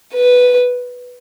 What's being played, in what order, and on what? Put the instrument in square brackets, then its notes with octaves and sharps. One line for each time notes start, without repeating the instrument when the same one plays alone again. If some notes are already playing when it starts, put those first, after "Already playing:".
[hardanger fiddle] B4